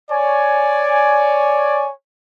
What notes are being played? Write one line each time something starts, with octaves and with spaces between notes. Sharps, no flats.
C#5 D5 G#5